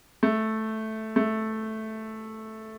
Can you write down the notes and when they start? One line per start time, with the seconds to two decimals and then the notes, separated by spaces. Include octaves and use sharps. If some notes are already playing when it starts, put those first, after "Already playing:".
0.23 A3
1.16 A3